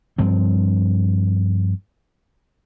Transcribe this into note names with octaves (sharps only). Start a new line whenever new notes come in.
G2 F3 C4